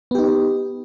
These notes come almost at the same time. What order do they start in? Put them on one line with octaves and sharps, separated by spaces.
B3 G4 D#4